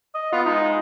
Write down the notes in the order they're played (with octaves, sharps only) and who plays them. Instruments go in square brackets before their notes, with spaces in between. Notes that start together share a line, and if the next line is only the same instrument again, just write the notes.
[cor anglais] D#5
[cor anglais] B3 [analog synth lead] F4
[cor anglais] G#3 [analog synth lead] D#4
[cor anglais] G#3